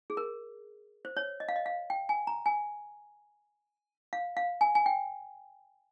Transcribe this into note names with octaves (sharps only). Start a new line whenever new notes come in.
G#4
A#4
C5
C#5
D#5
F5
D#5
F5
G5
G#5
A#5
G#5
F5
F5
G#5
G#5
G5